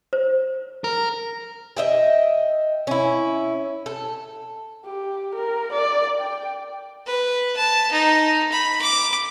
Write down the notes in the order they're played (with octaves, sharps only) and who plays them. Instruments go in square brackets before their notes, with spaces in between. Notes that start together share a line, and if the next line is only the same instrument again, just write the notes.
[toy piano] C5
[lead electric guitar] A#4
[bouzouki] D#5 E5 G5
C#4 E4
A4
[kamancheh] G4
A#4
D5
G5
[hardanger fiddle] B4
A5
D#4
B5
D6